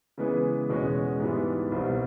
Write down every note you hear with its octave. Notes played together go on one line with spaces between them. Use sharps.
C#3 E3 G#3 B3
E2 B2 G#3 C#4 F#4
G#2 E3 G3 B3 E4
C2 B2 G3 C4